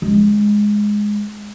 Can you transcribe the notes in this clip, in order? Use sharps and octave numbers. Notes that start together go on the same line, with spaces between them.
G#3 C#4